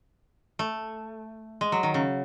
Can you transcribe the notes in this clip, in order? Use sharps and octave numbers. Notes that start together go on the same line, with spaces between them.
A3
G#3
F#3
D#3
C#3